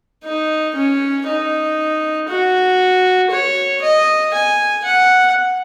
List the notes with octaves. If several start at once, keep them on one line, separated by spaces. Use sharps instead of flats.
D#4
C#4
D#4
F#4
C#5
D#5
G#5
F#5